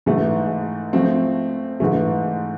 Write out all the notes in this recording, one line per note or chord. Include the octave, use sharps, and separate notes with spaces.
G#2 E3 A3
F3 A3 C4
G#2 E3 A3